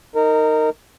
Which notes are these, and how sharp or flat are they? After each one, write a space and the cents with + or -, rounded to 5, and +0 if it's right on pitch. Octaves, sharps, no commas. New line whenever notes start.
D#4 +0 A#4 -20